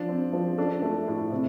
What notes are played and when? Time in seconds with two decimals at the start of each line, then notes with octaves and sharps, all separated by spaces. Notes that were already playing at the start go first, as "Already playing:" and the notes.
Already playing: F3 D4
0.08 C4
0.33 F3
0.58 D4 A4
0.82 A3
1.08 A2
1.32 C3